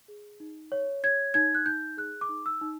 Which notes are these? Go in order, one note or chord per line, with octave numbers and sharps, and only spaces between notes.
G#4
D#4
C#5
C#5 G#6
D#4 G#6
F#6
D#4 G6
G#4 F#6
D6
D#4
E6
D#4